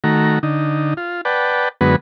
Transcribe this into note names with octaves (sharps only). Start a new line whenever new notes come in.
D#3 A3 F#4 A#5
D3 D#4
F4
B4 D5 F#5 G5 A5
F#2 D3 G#3 B3 F#4 B4